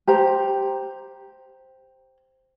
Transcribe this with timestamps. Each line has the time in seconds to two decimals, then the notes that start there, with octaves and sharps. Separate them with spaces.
0.07 G4 C5 A#5